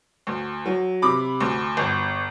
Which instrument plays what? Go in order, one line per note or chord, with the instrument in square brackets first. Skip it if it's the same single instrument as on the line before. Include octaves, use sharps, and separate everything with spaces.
[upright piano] D2
F#3
C3 B5 D6
D2
G1